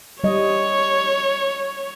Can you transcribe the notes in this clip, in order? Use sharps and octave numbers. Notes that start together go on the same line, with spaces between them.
G3 C#5 D#5